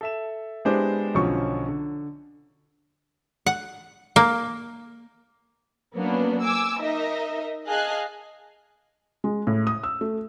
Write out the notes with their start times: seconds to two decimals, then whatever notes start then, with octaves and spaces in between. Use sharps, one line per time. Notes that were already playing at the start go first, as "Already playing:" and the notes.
0.01 A4 E5 E7
0.65 G#3 B3 D4 E4 G4 C5
1.14 B1 D3 F3 F#3 C#4 C#6
1.68 D3
3.46 F#5
4.16 A#3
5.95 F#3 A#3 B3 C#4 D4
6.43 G#5 D6 E6
6.80 D#4 A#4 D#5 E5
7.66 G#4 D#5 F5 G#5 A5 F#6
9.24 G#3
9.47 A2
9.67 D#6
9.84 E6
10.01 A3